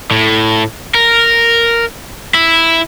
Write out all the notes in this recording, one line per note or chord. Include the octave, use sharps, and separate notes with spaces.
A2
A#4
E4